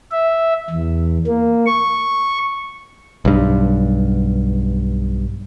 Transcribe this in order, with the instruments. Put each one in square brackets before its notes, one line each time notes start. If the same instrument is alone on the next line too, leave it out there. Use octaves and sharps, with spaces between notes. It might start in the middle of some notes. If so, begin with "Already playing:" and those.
[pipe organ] E5
E2
A#3
C#6
[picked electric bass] B1 G2